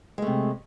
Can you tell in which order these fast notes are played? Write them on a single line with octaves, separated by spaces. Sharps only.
G#3 A3 C3